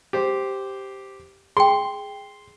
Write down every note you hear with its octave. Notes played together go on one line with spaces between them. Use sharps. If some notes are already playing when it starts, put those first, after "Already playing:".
G4 C5
G#4 G5 C6